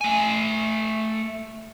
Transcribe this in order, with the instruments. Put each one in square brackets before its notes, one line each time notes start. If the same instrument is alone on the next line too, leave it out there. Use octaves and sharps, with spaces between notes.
[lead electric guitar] A3 G#5